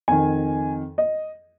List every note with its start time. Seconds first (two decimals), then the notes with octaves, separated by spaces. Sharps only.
0.08 F2 D#3 G#5
0.98 D#5